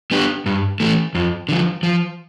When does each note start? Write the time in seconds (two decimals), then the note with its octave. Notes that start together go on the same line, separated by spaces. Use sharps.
0.11 B3 D4 G4
0.46 G2
0.80 E3 A3
1.15 F2
1.49 D3 F3
1.83 F3